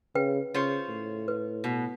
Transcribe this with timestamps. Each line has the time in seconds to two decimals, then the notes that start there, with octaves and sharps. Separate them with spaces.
0.15 C#3 B4 G5
0.54 C#3 F4 C5 C#5
0.89 A2
1.28 B4
1.64 B2